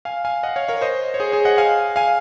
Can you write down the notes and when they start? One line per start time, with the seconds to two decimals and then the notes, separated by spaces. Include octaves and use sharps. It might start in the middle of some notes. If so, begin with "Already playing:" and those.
0.05 F5 G#5
0.25 F5 G#5
0.43 D#5 F#5
0.56 C#5 F5
0.68 A#4 C#5
0.81 C5 D#5
1.14 C#5
1.20 G#4 C5
1.32 G#4 C5
1.45 D#5 F#5
1.58 F5 G#5
1.96 F5 G#5